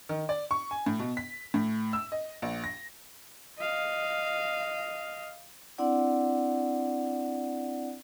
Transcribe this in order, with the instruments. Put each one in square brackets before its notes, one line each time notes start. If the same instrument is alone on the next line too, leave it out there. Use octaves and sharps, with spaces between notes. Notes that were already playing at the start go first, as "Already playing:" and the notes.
[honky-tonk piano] D#3
D5
C#6
G#5
A2
B2
B6
A2
E6
D#5
A#1
A#6
[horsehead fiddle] D#5 F5
[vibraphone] C4 D4 E4 D5 F#5